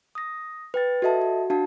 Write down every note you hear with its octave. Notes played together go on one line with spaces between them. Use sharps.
D#6 A#6
B4 G5 A6
F#4 A4 D#5 E5 A5
F#4
D4 F#4 F5 A5